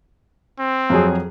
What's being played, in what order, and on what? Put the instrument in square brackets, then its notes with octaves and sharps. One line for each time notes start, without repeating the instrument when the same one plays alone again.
[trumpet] C4
[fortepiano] F2 F#3 G#4